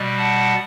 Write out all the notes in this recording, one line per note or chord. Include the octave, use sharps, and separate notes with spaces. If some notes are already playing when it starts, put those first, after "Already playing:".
Already playing: B2 G3
F#5 A5